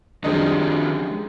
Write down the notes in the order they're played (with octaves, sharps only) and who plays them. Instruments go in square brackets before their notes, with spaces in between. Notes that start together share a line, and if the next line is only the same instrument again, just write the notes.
[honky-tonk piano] F#2 G3 D4 [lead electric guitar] D#3 F3 [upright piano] C4 G#4 D#5
[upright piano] G#3